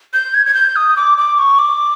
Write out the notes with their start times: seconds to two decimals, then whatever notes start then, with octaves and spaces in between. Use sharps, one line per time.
0.13 G6
0.34 G#6
0.46 G#6
0.54 G6
0.76 D#6
0.97 D6
1.18 D6
1.38 C#6
1.59 D6